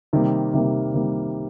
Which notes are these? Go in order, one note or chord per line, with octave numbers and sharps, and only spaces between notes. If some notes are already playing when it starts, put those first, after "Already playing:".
C3 D#3 G3 A#3
C3 D#3 G3 A#3
C3 D#3 G3 A#3